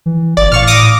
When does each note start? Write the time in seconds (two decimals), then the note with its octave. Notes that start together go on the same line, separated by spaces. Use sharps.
0.06 E3
0.37 G1 D5
0.52 A2 F5 C#6 F6
0.67 D6 D#6 A#6